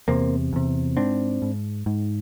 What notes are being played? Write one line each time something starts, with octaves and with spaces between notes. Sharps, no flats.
E2 C3 A#3 C4
E2 C3
G#2 C4 D4
G#2
G#2